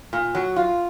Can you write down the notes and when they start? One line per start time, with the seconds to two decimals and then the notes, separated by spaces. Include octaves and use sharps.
0.13 A#2
0.35 F#3
0.56 F4